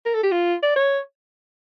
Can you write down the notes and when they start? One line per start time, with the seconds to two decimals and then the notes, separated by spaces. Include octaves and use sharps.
0.05 A#4
0.15 A4
0.23 G4
0.32 F4
0.63 D5
0.76 C#5